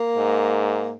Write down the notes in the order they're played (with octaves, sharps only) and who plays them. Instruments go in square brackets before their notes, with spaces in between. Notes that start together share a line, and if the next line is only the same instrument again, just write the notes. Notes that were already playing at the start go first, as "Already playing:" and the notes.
Already playing: [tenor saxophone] A#3
[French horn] G#2